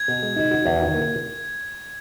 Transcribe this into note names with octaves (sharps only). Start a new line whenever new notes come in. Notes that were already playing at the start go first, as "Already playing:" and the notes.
Already playing: G#6
B2
G#3
D#4
F#4
E2
D#3
A#3